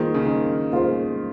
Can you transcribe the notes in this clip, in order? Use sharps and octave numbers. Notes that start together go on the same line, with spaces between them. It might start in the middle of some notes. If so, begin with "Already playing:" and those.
Already playing: D#3 A#3 F4 G#4 C5
C#3
D#3
A#3 F4 G#4 C5